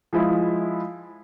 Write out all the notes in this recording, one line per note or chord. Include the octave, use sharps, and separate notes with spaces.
F3 G#3 E4